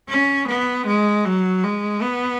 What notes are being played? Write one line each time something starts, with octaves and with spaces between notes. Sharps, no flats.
C#4
B3
G#3
F#3
G#3
B3